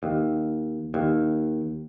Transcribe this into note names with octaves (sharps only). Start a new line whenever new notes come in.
D#2
D#2